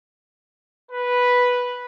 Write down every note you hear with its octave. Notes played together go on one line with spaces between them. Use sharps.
B4